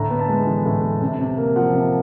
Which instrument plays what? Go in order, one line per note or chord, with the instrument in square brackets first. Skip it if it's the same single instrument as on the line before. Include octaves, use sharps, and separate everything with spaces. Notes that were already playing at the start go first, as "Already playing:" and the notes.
Already playing: [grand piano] A2 D3 A#5
B3
A5
G#3
E3
A2
B3
C3
C3
A#3
F3 F#5
C3